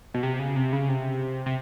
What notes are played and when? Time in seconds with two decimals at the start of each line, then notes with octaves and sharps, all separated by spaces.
0.14 B2
0.23 C3
0.39 C#3
0.56 C3
0.73 C#3
0.89 C3
1.46 C3